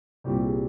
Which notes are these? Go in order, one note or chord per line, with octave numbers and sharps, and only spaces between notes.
C2 A#2 G3 C4 G4
G#4